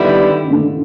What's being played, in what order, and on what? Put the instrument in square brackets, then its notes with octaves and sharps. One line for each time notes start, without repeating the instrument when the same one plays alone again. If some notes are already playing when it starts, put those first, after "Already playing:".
Already playing: [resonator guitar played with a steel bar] D3 G3 B3 E4 [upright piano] D#3
[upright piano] C#3
D3